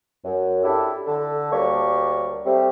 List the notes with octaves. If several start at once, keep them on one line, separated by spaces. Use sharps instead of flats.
F#2
D4 E4 G4 A4
D3 A4
D2 G3 A#3 D4 C#5 C#6
G3 A3 C4